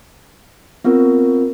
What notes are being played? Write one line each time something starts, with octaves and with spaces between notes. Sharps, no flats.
B3 C4 F4 A#4